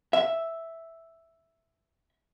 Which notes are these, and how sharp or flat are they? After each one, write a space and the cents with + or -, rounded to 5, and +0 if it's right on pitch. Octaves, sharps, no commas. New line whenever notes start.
E5 +0